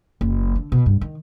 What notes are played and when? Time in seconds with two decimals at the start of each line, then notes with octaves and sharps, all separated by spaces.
0.21 F#1
0.55 D3
0.72 B2
0.86 G2
1.01 D#3